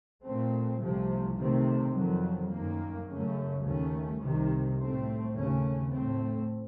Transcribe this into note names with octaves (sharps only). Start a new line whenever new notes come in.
A#2 A3 C4
C2 C3 F3 A3
C3 D#3 A3 C4
F2 D#3 F#3
F#2 D#3 A#3
F#2 C#3 A3 C#4
D#2 D#3 A3 C#4
C2 C3 D#3
A2 A3 C4
D#2 C#3 A3 C#4
A2 A3 C4